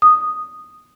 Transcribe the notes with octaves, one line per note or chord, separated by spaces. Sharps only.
D#6